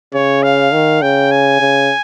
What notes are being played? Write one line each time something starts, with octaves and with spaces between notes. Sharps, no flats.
C#3 C#5
F5
D#3
C#3 G5
G#5
C#3